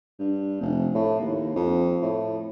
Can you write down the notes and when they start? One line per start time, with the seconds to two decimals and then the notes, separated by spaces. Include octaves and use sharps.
0.19 G2
0.61 F1
0.95 A2
1.20 D#2
1.56 F2
2.02 A2